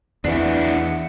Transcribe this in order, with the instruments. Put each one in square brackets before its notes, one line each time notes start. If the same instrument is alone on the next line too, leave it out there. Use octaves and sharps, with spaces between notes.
[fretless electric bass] E2 E3 [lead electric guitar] D4 E4 [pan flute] F#5